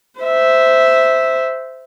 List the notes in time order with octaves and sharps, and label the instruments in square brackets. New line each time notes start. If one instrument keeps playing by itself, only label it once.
[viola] C5 E5